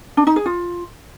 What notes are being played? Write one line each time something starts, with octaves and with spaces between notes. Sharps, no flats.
D4
D#4
G#4
F4